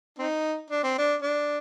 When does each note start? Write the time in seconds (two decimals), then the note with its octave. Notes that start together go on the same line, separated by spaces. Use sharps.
0.19 C4 D#4
0.70 D4
0.84 C4
0.98 D4
1.22 D4